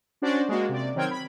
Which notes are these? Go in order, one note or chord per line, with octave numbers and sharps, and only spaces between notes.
C#4 D4 F#4 C5 D5
G#3 A#3 F#4
C3 D5
D#3 F#3 C4 G5 F6 G#6
B5